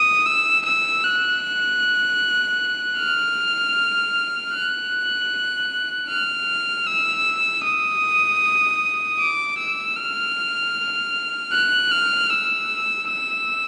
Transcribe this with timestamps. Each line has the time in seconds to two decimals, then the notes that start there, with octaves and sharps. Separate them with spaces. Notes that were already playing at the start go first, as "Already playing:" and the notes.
Already playing: D#6
0.26 E6
0.65 E6
1.04 F#6
2.98 F6
4.54 F#6
6.09 F6
6.87 E6
7.64 D#6
9.19 D6
9.58 E6
9.97 F6
11.53 F#6
11.91 F6
12.30 E6
13.08 E6